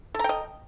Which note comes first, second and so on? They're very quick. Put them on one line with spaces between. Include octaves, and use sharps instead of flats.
A4 A#5 G5 D#5